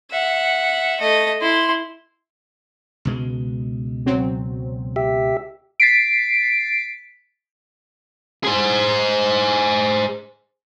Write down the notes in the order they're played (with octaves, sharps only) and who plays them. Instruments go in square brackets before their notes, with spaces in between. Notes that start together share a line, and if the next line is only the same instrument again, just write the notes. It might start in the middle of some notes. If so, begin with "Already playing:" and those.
[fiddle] E5 F#5
A3 D#5
E4 C6
[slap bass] C#2 B2 G#3
[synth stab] F#3 C4
[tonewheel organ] G4 E5
[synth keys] A6 B6 C7 D7
[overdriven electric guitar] G#4 C5